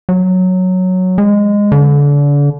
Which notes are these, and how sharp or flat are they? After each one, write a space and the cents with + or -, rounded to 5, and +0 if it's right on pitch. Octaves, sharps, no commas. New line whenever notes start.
F#3 -5
G#3 -15
D3 -35